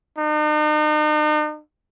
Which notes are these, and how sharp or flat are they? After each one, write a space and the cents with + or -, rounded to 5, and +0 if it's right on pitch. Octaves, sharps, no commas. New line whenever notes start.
D#4 -45